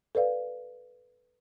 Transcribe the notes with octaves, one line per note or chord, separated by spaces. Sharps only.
A4 B4 D5 F5